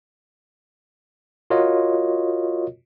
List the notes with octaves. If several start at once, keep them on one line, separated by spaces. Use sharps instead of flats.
F4 F#4 A#4 C#5 D#5